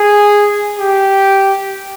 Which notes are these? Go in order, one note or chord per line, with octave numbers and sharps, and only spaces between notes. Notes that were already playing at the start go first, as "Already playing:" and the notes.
Already playing: G#4
G4